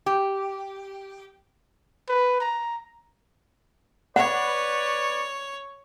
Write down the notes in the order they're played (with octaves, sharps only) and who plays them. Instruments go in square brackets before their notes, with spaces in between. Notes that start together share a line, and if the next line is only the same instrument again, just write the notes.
[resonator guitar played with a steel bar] G4
[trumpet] B4
A#5
[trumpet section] B4 D5 [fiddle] C#5 [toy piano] F#5